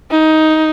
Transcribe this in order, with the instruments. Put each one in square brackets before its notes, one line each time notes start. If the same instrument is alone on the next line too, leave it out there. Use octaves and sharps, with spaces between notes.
[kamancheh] D#4